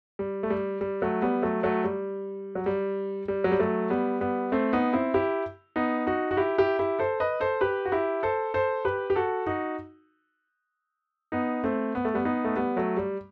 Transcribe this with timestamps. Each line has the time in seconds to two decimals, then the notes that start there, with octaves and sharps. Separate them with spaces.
0.19 G3
0.43 A3
0.50 G3
0.81 G3
1.02 F#3 A3
1.22 G3 B3
1.42 F#3 A3
1.63 F#3 A3
1.84 G3
2.55 F#3
2.66 G3
3.28 G3
3.44 F#3
3.52 G3
3.59 F#3 A3
3.90 G3 B3
4.21 G3 B3
4.52 A3 C4
4.73 B3 D#4
4.93 C4 E4
5.14 E4 G4
5.76 B3 D#4
6.06 D#4 F#4
6.31 F#4
6.37 E4 G4
6.58 E4 G4
6.79 E4 G4
6.99 A4 C5
7.20 B4 D#5
7.40 A4 C5
7.61 G4 B4
7.85 F#4
7.92 E4 G4
8.23 A4 C5
8.54 A4 C5
8.85 G4 B4
9.10 G4
9.16 F#4 A4
9.46 D#4 F#4
11.32 B3 D#4
11.64 A3 C4
11.95 B3
12.05 A3
12.14 G3 B3
12.25 B3 D#4
12.45 A3
12.56 G3 B3
12.76 F#3 A3
12.97 G3